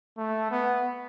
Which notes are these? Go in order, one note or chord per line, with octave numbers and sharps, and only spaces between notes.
A3
B3